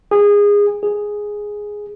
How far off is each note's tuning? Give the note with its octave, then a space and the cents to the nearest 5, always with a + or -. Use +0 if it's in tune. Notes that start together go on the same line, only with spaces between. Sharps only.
G#4 -20
G#4 +0